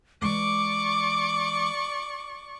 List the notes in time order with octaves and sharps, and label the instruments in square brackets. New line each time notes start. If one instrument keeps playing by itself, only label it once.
[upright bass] E3 G#3 [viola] D5 C#6 [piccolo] D6